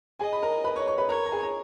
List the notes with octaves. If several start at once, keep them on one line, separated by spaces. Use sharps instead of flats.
G#4 D#5 G#5
B5
A#4 A#5
B4 B5
C#5 C#6
C#5 C#6
B4 B5
A#4 C#5 A#5
A#5
G#4 G#5
A#5